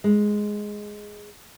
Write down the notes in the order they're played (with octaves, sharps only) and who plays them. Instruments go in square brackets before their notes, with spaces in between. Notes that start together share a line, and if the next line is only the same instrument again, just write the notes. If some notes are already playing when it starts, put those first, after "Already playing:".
[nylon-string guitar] G#3